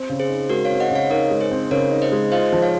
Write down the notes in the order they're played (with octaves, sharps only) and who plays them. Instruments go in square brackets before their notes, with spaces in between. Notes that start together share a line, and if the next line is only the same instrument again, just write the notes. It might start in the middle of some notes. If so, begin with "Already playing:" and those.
Already playing: [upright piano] C4
C#3
[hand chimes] G#4 C5
[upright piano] D#4
[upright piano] G#3 [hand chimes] F#4 A#4
[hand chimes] C#5 F5
[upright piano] C4
[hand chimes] D#5 F#5
[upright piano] C#3 [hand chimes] C#5 F5
[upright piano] D#4 [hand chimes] A#4 C#5
[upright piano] G#3
[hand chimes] G#4 C5
[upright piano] C4
[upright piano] C#3 [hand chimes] A#4 C#5
[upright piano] D#4
[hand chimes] C5 D#5
[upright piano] G#3
[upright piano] F4 [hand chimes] C5 D#5
[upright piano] F3
[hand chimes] C#5 F5